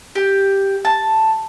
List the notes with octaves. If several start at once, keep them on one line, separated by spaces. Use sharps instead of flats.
G4
A5